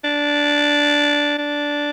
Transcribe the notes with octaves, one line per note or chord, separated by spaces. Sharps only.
D4
D4